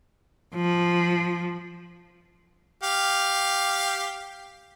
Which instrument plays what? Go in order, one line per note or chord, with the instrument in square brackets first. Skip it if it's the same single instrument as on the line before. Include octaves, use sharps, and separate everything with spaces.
[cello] F3
[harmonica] G4 F5